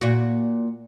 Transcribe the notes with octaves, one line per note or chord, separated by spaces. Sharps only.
A#2 F#4